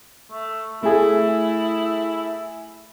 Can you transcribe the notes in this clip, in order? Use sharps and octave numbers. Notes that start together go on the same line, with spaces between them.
A3
A3 E4 G#4